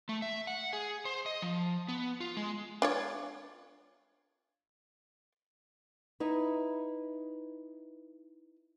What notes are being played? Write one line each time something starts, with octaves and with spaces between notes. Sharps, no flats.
A3
E5
F#5
G#4
C5
D#5
F3
B3
F4
G#3
D4 F4 C#5
D#4 E4 B4